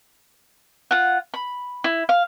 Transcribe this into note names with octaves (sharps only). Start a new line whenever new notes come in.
F4 F#5
B5
E4
F5